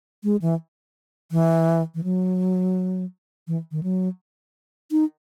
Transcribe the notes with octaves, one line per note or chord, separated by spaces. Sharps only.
G#3
E3
E3
E3
F#3
E3
D#3
F#3
D#4